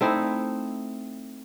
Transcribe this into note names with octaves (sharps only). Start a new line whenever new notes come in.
A3 C4 D#4 E4